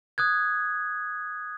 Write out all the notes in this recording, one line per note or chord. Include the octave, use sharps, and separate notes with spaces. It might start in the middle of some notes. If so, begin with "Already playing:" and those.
D#6 F#6 G#6